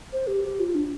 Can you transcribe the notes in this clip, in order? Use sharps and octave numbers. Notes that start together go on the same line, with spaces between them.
C5
G4
G4
F4
D4